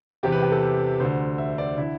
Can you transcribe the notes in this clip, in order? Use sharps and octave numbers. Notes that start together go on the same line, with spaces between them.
E2 C3 E3 G4
B4
G4
A4
D2 D3 C5
E5
D5
D3 E4